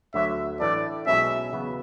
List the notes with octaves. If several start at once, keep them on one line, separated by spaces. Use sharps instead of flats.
D2 D3 F#3 E5
A2 E3 A3 D4 D5
B1 B2 G#3 C#4 E5
E2 C#3 F#3 B3